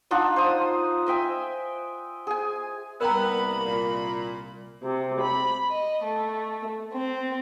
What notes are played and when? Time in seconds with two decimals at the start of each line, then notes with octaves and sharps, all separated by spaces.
0.11 D4 D#4 F4 F#5
0.36 C5 D#6
1.07 D#5 E5 G5 G#5
2.27 G#4 G#5
3.01 C2 A#3 B3 A#4 G5 A#5 B5
3.67 A#2
4.83 C3
5.19 B5
5.69 D#5
6.04 A3
6.92 C4